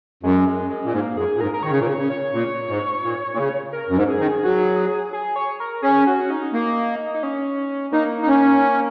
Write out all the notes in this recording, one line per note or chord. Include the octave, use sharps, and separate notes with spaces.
F#2 G#3
G#3
G#3
A#2
G#2 A#3
F#2 G#4
A#2
G#2 A#4
A#4
D#3 C#5
C#3
A#2 A#4
C#3 C#5
C#3
C#5
A#2
G#2
A#2
A#2
C#3
A#4
F#2
G#2
G#4
D#3
F#3
G#4
C#5
A#4
C#4 G#4
F#4
D#4
A#3 D#4
D#4
C#4
A#3 D#4
D#4
C#4